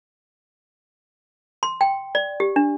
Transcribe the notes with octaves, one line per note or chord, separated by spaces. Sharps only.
C6
G5
D5
G4
D4